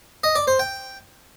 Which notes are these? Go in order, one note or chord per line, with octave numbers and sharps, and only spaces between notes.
D#5
D5
C5
G5